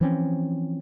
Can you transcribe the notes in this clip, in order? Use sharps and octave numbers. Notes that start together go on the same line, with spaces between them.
E3 F3 C4 C#4